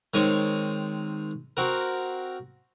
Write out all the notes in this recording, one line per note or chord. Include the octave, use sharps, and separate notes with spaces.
D#3 G#3 C4 C#5
C4 F#4 A#4